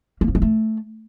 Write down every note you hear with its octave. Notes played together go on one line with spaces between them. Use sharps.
A#3
F3
G#3
A3